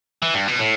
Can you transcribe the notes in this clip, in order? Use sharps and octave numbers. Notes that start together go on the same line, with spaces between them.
E3
G2
B2
A2